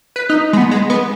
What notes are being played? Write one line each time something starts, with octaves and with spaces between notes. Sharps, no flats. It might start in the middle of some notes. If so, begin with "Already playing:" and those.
B4
D#4
G#3
B3
G#3
B3